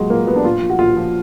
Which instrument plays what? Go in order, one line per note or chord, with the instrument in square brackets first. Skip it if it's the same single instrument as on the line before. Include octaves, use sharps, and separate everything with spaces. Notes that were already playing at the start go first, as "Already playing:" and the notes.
Already playing: [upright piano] A#2 F#3 G#3
A#2 A#3
F#3 B3
D4
A#2 F4
F3
F#4
A#2 F4
F3